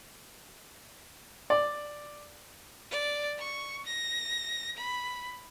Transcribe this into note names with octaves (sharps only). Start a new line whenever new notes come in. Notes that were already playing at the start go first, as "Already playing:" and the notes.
D5
D5
C#6
A#6
B5